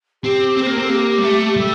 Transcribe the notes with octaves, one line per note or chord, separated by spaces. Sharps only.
C4 G4
C4
C5
A#3 A#4
C4 A4
A#3 G4
G3
A3
G3 A4